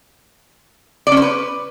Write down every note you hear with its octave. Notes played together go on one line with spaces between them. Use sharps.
D5
C#4
C5
B4